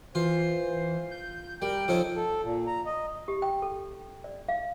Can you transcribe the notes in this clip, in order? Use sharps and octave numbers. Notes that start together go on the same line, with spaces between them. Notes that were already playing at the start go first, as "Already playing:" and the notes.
E3 F4 C5
G6
G3 A#4 G5
F3 C#4 D#4 A4
A4
A#2
A#5
D#5
G4
G5
A4
D5
F5